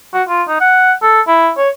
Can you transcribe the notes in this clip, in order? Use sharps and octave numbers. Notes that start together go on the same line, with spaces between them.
F#4
F4
D#4
F#5
A4
E4
C#5